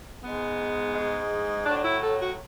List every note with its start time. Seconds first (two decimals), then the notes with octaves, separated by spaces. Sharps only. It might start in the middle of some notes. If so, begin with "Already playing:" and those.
0.23 G#2 G#3 B3
0.95 G#2 G#3
1.65 A2 F#3 D4
1.77 D4
1.84 E4
2.01 A4
2.19 F#4